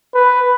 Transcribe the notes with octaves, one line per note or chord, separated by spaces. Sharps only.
B4